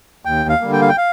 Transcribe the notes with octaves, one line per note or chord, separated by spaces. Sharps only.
D#2 G5
F5
D3 G3 A#3
G5
F5
G5
F5